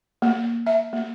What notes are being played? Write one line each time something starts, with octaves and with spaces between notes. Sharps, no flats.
A#3
E5
A#3